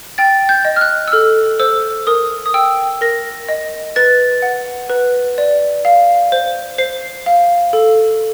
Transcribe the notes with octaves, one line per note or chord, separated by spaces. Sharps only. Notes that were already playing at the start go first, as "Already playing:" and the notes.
G5 A6
G6
D#5
F6
F#6
E6
A4 F6
C5 E6
A#4 D#6
D#6
G5 E6
A#4 A#6
D#5
B4 A6
F#5
B4
D5
F5
C5
C5 C7
F5
A4